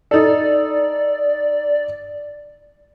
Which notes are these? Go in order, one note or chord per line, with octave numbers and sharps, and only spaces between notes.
D#4 A4 D5